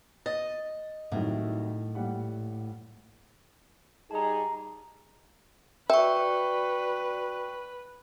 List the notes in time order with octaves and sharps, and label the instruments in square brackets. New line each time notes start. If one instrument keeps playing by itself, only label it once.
[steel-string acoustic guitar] D#5 [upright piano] A6
[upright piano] C2 D#3 F#3 [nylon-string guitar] A2
[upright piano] A#1 G3 F#5
[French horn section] G3 D#4 G#4 [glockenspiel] A5 A#5
[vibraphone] F#4 D5 [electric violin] B4 [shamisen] E5 [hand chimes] G5 C#6